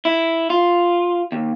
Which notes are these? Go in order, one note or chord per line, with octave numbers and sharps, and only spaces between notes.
E4
F4
D#2